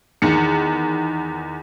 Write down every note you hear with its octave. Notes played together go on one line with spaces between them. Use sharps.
E2 D#3 C#7